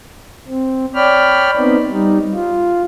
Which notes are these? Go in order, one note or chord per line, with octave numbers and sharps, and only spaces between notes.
C4
C#5 D5 G5 B5 F6
B3 C4 D#4
G3 D#4
F4